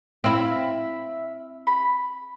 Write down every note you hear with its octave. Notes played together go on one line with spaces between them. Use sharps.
C4 E4 E5 F5
B5